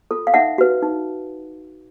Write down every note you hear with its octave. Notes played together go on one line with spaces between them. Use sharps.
F4 A4
F5
D#4 E5 F#5
F#4 B4
D#4